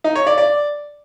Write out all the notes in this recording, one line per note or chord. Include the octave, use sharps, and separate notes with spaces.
D#4
C#5
D5
D5